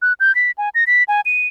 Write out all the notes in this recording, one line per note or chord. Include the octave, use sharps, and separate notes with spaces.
F#6
G6
B6
G#5
A#6
B6
G#5
D#7